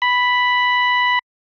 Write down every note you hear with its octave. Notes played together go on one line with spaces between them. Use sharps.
B5